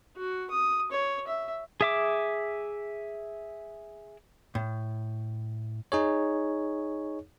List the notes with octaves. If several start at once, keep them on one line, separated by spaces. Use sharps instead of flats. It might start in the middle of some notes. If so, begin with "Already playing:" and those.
F#4
D#6
C#5
E5
G#4 E5 D6
A2
D#4 G#4 C#5